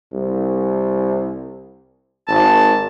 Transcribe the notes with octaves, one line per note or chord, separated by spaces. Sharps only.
C2
G#1 A5